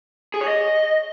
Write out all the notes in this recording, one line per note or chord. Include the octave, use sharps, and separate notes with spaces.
G#4
C#5
D#5